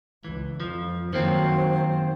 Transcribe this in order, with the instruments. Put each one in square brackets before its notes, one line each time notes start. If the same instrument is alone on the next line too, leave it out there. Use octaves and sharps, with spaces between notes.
[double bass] C#2 [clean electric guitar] E3
[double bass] F2 [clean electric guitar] F3
[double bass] F#2 F#3 [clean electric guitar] D#3 A#3 C4 [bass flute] C5